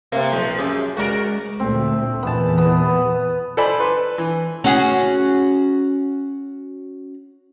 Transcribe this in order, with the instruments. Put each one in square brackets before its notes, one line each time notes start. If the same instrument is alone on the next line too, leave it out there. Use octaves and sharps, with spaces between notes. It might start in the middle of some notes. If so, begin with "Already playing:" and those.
[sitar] C3 [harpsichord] A#3 C5
[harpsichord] B1 [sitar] F3
[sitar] F#2 [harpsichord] G4 G#4
[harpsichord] C#2 D5 G#5 [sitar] F#4 A#4
[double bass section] D2 A#2 A3 [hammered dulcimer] C4
[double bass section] E2 A#2 E3 [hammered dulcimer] B3 A5
[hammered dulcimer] B3
[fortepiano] A4 C5 D5 G#5 B5
B4 C6
E3
[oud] C#4 F#4 G#4